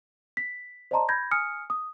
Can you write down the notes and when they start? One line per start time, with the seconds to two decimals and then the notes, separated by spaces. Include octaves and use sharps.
0.37 B6
0.91 C5 D5 D#5 A5 A#5 C6
1.09 B5 G6 G#6 A#6
1.31 G#5 D#6 F6 C#7
1.70 D#6